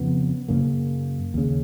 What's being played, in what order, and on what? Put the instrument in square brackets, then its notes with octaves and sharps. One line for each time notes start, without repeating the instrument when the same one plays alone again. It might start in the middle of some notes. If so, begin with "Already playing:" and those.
Already playing: [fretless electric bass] F2 C#3 B3
F#2 C#3 A#3
D#2 C#3